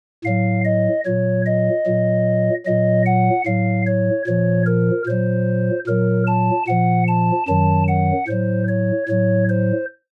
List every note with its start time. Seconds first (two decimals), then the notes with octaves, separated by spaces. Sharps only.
0.24 A2 F#3 F5
0.64 D#5
1.05 A#2 F#3 C#5
1.46 D#5
1.86 A#2 F#3
2.66 A#2 F#3 D#5
3.06 F#5
3.46 A2 F#3 F5
3.86 C#5
4.26 A#2 F3 C#5
4.66 A#4
5.06 A#2 F#3 C5
5.86 A#2 F#3 A#4
6.27 A5
6.67 A#2 F3 F#5
7.08 A5
7.47 F#2 D#3 F#3 A5
7.88 F#5
8.27 A2 F#3 C5
8.68 C#5
9.08 A2 F#3 C#5
9.49 C5